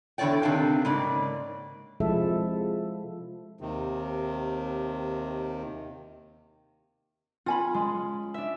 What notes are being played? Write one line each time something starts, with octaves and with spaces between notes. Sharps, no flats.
E2 D3 F3 C#5 D5 G5
C3 D#3 D4 F5 G5
G#2 C#3 A#3 D5
C3 F3 G#3 E4 A4 E5
D#2 C3 D#3
C#4 F4 G#5 B5
G#3
D4 E5